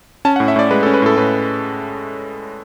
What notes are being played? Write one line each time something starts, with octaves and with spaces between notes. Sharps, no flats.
C#4 A5
F#5
A2
E5
A2 D5
G#3 B4
A4
C#4
B4
A2 A4
A2 B4